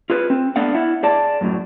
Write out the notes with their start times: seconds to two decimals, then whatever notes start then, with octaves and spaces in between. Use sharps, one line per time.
0.10 F4 G#4 B4
0.30 C4
0.56 A3 B3 D4 F5 F#5
0.75 E4 E5 F#5
1.03 G#4 D5 A5
1.41 F#2 A2 F#3